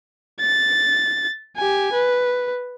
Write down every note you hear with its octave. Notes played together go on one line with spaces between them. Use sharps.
A6
G4 G#5
B4